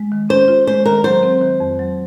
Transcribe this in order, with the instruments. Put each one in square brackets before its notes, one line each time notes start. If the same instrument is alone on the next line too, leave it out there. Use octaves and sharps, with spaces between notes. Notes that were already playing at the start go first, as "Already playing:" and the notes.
Already playing: [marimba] G#3
D#3
[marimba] C#4 [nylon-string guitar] C5
[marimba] F4
[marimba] G#3 [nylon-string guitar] C5
[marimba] D#3 [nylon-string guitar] A#4
[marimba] F#3 [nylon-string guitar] C5
[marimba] C4
D#3
F2
F#3